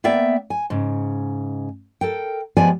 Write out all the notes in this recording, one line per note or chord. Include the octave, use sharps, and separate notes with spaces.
A#3 B3 D5 E5 G5
G#5
G#2 C#3
A4 A#4 G5
F3 G#3 B3 G4 D5 G#5